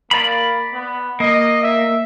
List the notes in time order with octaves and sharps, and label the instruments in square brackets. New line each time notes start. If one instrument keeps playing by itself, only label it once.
[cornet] A#3 [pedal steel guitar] D5 B5
[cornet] B3
[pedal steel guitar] A#3 [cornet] D#5
[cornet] E5